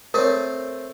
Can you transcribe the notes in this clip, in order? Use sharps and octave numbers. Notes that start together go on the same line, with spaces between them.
A3 C4 A#4 C#5